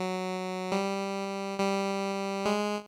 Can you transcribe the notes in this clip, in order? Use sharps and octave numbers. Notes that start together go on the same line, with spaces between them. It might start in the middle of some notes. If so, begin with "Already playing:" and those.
Already playing: F#3
G3
G3
G#3